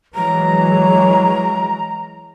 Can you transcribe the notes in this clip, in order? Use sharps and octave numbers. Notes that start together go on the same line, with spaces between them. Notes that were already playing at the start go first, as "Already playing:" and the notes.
E3 F#3 G#3 A#5